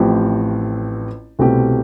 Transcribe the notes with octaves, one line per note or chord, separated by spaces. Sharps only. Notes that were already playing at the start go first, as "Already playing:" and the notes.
Already playing: A1 A2 F3 C4 G4
C2 B2 A3 C4 G4